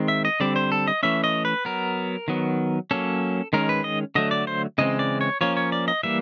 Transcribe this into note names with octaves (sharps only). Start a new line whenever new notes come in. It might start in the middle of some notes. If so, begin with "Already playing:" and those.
Already playing: D#3 G#3 C4
E5
D#5
D3 G3 C4 D5
C5
A4
D#5
E3 A3 C#4 E5
D#5
B4
F#3 B3 A#4
D#3 F#3 B3
F#3 A#3 C#4 A4
D#3 G#3 C#4 A#4
B4
D#5
D3 F#3 A3 D#5
D5
C5
C#3 E3 G#3 C4 D#5
D5
C#5
F3 A#3 C#4 C#5
C#5
D5
D#5
E3 G3 A#3 E5